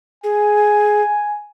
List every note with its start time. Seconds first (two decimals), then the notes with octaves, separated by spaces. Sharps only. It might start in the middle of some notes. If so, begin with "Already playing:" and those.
0.24 G#4 G#5